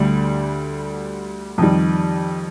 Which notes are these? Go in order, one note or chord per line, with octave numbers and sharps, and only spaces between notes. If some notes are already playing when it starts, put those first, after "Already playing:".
Already playing: D2 D3 G3
F2 D#3 G3